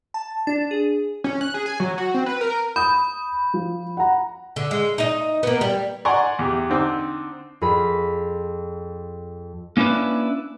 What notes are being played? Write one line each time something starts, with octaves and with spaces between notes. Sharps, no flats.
A5
D4
G#4
C#4
F#6
G#4
G#5
F#3
F#4
C4
B4
A#4
B5 D#6 G6
F3
F#5 A#5
D3
G#3
D#4 D#5
A#3 B3
G3
D5 F#5 G#5 A#5 C6 C#6
E2 G4
D3 C4 D#4
F2 G#4 B5 B6
A#3 C#4 D4 E4 B4